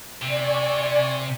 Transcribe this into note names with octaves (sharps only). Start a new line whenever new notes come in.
C3 D5 G#5 C#6